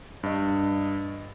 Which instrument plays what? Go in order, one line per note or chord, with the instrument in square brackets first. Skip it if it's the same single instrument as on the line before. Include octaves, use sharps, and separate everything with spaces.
[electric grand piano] G2 D#5